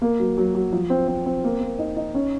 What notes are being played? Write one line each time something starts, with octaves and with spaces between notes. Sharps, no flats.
A#3
F#3
F#3
F#3
F3
C4
C4
C4
A#3
A#3
D#4
D#4
C#4